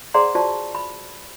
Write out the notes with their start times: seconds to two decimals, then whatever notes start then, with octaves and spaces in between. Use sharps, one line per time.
0.14 G#4 C5 D5 F#5 A#5 C6
0.35 F4 F#4 C5 D5 A5 C#6
0.75 B5